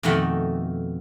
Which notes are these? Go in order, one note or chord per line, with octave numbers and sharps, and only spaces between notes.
F2 B2 D#3 A3 D#4 F#5